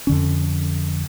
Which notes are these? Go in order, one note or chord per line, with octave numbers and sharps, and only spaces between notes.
F2 D3 C#4